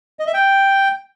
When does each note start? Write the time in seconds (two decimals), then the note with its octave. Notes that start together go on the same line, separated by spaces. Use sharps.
0.19 D#5
0.27 E5
0.34 G5